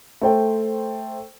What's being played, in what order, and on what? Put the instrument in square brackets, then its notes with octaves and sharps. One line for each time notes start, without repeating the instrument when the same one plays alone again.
[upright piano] A3 C5 G5